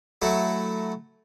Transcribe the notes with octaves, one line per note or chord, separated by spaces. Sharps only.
F#3 A3 E4